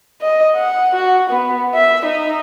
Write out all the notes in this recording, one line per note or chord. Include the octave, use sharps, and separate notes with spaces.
D#5
F#5
F#4
B3
E5
D#4